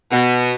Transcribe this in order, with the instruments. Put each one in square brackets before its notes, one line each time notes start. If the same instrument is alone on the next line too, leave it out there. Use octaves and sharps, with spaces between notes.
[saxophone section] B2